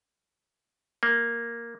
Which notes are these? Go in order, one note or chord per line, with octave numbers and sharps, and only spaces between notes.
A#3